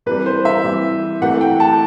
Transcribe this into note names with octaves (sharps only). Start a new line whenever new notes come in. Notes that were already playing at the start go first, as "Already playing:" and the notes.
C3 E3 G3 B4
C5
E5
C3 E3 G3
C3 E3 A3 F#5
G5
A5